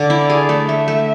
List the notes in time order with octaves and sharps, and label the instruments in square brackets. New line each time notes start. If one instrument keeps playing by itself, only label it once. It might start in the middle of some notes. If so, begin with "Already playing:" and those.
Already playing: [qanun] D3 [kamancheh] D5
[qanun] E4
G#4
A3
[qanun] A3 [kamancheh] E5
[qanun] A3